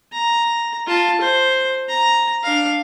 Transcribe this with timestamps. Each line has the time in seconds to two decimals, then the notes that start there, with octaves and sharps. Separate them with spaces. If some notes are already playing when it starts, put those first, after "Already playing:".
0.13 A#5
0.87 F4 A5
1.21 C5
1.89 A#5
2.43 D4 F5